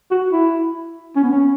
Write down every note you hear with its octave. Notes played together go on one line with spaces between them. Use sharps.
F#4
E4
C#4
B3
C#4